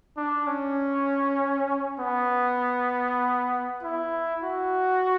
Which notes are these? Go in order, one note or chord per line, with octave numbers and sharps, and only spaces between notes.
D4
C#4
B3
E4
F#4